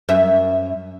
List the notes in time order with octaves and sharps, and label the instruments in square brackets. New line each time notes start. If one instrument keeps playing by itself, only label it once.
[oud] F#2 E5